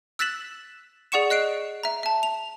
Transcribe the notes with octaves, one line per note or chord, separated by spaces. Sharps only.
E6 F#6 A6 B6 E7 F#7
G#4 D5 F#5 C#6 C#7 E7
D#5 F#6 C7 D7
E5 A#5
E5 A5
F7